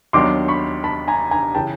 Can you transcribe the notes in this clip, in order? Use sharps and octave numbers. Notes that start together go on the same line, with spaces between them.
D#2 D#3 F#3 B3 D4 C6 D6
B5 C#6
A5 B5
G#5 A#5
G#5 A#5
C#3 E3 G5 A5